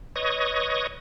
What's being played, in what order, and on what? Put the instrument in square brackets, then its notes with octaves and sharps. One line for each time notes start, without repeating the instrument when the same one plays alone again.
[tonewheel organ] B4 C#5 D#5 C#6 D#6